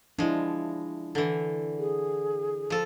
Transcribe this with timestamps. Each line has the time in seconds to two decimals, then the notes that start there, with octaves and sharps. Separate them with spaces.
0.19 F3 G#3 D4 E4
1.15 D3 E3
1.78 G#4
2.70 F3 A4